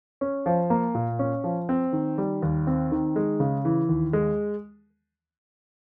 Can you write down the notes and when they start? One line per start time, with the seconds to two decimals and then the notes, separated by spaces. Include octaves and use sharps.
0.21 C#4
0.46 F3
0.70 A#3
0.95 A#2
1.19 C#4
1.44 F3
1.69 C4
1.93 D#3
2.18 G3
2.42 D#2
2.67 C4
2.92 D#3
3.16 G#3
3.40 C#3
3.65 E3
3.89 D#2
4.13 G#3